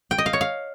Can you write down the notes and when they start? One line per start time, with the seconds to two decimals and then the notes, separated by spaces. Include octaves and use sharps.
0.11 G5
0.18 D#5
0.26 F5
0.33 C#5
0.41 F5